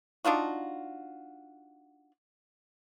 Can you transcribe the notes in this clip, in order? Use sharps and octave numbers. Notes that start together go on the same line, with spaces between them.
D4 D#4 F4 F#4